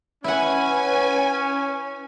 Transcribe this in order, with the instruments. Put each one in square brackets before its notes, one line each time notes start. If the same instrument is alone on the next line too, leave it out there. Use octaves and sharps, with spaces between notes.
[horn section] C#4 [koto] E4 F#5 [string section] B4 G#5